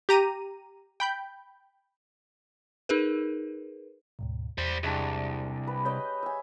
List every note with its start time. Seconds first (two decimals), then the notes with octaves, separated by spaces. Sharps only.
0.09 G4 A#5 D#7
1.00 G5 B5 G6
2.89 D#4 G#4 A#4 B4
4.19 D2 G#2 B2
4.58 E2 G3 C5
4.83 C2 G#3 D4 G4
5.67 B4
5.85 B4 C#5 D#5 G6
6.23 E5 G#5